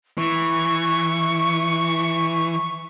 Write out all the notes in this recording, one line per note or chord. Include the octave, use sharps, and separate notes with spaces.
E3 C#6